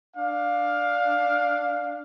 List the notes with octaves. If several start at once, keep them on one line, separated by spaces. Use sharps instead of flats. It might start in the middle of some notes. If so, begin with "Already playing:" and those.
D4 F5